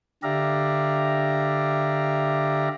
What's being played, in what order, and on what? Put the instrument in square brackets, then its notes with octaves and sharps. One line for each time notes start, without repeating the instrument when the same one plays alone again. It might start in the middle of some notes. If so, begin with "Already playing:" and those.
[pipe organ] D3 G4 D5 E5 F5 A#5